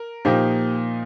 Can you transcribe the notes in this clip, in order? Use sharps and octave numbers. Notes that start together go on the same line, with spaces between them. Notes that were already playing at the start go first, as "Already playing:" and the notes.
Already playing: A#4
A#2 F3 A#3 D#4 G4